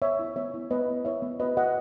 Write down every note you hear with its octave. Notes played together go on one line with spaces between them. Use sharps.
B3 C#5 E5
E4
B3 C#5 E5
E4
B3 B4 D#5
E4
E4 C#5 E5
B3
F#4 B4 D#5
F#4 D#5 F#5